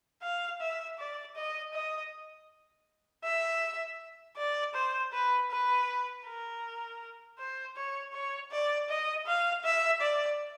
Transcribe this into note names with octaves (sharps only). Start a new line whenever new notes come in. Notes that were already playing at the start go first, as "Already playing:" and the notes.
F5
E5
D5
D#5
D#5
E5
D5
C5
B4
B4
A#4
C5
C#5
C#5
D5
D#5
F5
E5
D5